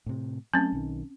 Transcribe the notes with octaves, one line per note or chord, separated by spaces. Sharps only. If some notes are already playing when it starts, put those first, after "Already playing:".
A2 C3
F#3 A3 C4 C#4
B1 D#3